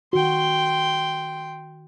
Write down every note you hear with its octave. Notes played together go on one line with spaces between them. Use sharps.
D#3 F#4 G5 C6